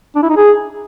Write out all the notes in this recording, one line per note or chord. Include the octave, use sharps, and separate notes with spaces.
D4
E4
D#4
G#4